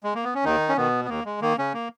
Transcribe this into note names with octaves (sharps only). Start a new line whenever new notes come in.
G#3
A#3
B3
C#4
D#2 D#3 D#4
C#4
B2 D#3 B3
B3
D#2 A#3
G#3
D#3 A#3
C#3 C#4
A#3